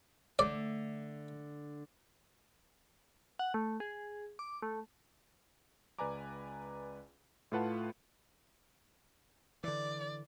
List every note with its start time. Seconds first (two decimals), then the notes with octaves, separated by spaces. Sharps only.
0.39 D3 A3 D5
3.39 F#5
3.54 A3
3.80 G#4
4.39 D6
4.62 A3
5.99 C#2 B4 D5 G#5 A#5 D6
7.52 A2 A3 F4 B4 F#5 A5
9.64 D3 E3 D5